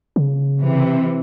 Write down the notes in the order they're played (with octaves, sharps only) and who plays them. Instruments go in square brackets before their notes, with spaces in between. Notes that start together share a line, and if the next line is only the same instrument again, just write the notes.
[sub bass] C#3
[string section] C3 E3